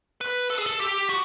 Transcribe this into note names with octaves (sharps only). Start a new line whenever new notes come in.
B4
A4
G#4
A4
G4
F#4